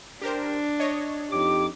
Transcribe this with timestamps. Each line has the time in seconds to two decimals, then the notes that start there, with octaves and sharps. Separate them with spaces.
0.22 D4 G4 A#4 C5
0.80 C#5 D#5
1.31 F2 D#4 G4 D6